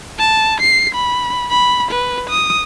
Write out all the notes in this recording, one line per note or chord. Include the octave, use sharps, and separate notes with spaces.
A5
C7
B5
B5
B4
D#6